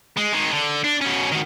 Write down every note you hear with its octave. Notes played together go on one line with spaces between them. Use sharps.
G#3
D#3 G#3
D3
D4
B2 C#4
D#3 F#4